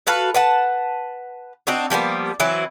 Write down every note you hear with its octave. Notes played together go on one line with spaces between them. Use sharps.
F#4 A4 B4 F5
B4 F#5 A5
C4 D4 D#4 F#4
F3 G3 A#3 B3
E3 F#3 C4 E4